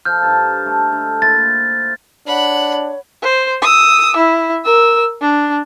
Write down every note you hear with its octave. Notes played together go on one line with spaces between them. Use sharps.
F3 A4 F6 G6
G2 D#4 A5
A3 D#4 A4
D3
A#2 E4 C5 A6
D4 C#5 F#5 B5
C5
D#6 E6
E4
A#4 E6
D4